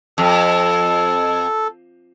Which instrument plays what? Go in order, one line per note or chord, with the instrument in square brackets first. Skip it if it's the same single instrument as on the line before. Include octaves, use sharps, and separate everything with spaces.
[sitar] F2 [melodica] A4